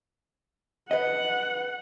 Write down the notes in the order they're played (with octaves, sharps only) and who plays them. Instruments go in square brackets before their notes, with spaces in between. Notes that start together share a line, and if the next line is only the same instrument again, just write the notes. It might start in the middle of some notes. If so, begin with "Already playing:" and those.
[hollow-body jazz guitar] B4 D#5 [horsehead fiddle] F#5